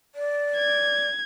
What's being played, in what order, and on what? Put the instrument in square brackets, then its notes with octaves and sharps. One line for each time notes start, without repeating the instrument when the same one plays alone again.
[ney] D5
[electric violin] G#6